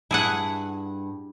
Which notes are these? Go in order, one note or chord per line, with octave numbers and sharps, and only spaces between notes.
G2 E4 G#4 F#5